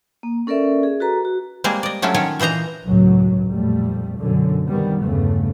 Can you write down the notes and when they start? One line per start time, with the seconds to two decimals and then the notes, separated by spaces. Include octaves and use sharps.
0.23 A#3
0.47 C#4 A4 A#4 D5 E5
0.83 G#4
1.00 F#4 A4 B4 A#5
1.25 F#4
1.64 G3 G#3 A#3 C4 G#4
1.83 D5 D#5
2.02 F#3 A3 C#4 E4 F4
2.14 D#3 C#4 F4 C#5
2.40 A#2 E3 C5 D#5 A#5
2.87 C#2 F#2 A2 F#3
3.51 F2 A#2 G3 A3
4.18 F#2 B2 D3
4.68 C3 D#3 G3 B3
5.01 E2 G2 C#3 A3 B3